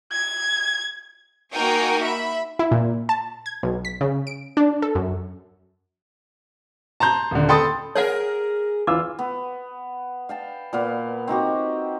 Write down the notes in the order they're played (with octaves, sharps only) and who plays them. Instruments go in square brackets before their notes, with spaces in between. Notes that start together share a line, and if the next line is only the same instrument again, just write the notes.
[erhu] G#6
[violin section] A#3 D#4 F#4 A#4 G5 G#5
E5 B5
[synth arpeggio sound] E4
A#2
A5
G#6
B1
B6
C#3
D7
D4
A4
F#2
[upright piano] A5 A#5 C6 G6
D#1 D3
A4 G5 B5 C6 D#6 A6
[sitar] G#4 A#4 [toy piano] C#5 F#5
[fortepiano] E3 F4 E6 [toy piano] D6
[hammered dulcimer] B3
F5 G5 A5
A#2 B3 F5
C4 D#4 F#4 G4